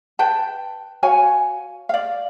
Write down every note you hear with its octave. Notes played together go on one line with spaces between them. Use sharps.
B4 G5 A5
F#4 C#5 F5 G#5
D5 F5